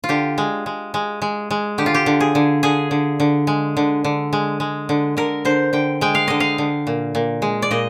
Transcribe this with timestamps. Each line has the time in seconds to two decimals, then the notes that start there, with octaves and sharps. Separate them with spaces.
0.04 F4
0.09 D3 G4
0.38 G#3
0.66 G#3
0.94 G#3
1.22 G#3
1.51 G#3
1.78 D3 G4
1.86 F4
1.94 G4
2.06 D3
2.20 G#4
2.35 D3
2.63 D3 G#4
2.91 D3
3.20 D3
3.47 G#3
3.77 D3
4.04 D3
4.33 G#3
4.60 G#3
4.89 D3
5.17 D3 A#4
5.45 D3 C5
5.73 D3 G5
6.01 G#3 G5
6.15 F5
6.28 D3 D#5
6.40 F5
6.58 D3
6.87 A#2
7.15 A#2
7.42 G#3
7.62 D5
7.71 A#2 D#5